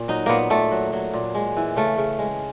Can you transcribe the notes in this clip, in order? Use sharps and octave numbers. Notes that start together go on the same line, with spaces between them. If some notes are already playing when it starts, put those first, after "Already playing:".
Already playing: A#2
F#3 D#4
A#2 A#3 B3
A#2 A3
F#3
F#3
A#2
G#3
E3
C#3 A3
C#3
G#3